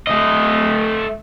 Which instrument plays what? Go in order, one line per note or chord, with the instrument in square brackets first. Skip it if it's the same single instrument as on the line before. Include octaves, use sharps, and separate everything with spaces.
[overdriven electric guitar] A3 D#5